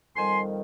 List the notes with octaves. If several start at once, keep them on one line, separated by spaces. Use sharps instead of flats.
F2 D#3 G3 G#5 C6